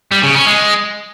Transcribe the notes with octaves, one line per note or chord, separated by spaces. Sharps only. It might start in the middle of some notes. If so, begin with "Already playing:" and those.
G3
C#3
C#4
G#3